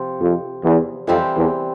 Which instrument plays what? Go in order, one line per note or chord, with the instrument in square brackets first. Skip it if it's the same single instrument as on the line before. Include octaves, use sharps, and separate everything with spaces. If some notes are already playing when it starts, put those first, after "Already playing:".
Already playing: [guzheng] C3 F3 C4
[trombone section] F2
E2
[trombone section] F2 [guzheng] E3 G3 C4 G4 A#4
[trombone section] E2